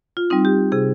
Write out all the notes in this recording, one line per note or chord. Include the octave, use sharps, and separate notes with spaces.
F4
G3 C4 D#4
G4
C3 G#4